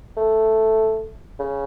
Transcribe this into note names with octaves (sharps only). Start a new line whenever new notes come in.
A3
C#3